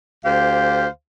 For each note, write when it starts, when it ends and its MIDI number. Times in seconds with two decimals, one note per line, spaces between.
0.25 0.87 38
0.25 0.87 67
0.25 0.87 72
0.25 0.87 77